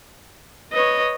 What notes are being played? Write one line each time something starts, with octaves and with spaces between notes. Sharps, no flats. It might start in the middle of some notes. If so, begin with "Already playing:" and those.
B4 C#5 D#5